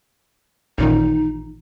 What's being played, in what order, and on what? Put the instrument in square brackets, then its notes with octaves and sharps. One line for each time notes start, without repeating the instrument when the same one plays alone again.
[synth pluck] A1 A#2 D#3 [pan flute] D#4